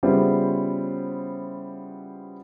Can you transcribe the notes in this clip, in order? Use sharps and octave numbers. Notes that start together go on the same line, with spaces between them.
C#3 G3 B3 E4 F4 C5